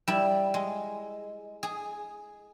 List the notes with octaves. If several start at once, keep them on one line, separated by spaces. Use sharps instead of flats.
G3 E4
G#3
G#4